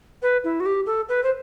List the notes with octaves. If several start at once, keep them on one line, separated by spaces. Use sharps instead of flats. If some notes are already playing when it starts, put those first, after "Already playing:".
B4
E4
F#4
G4
A4
B4
C5